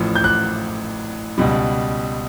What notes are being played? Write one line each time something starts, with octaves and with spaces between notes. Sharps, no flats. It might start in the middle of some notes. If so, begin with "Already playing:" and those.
Already playing: A1 A2 F3
G6
F#6
C#2 B2 G3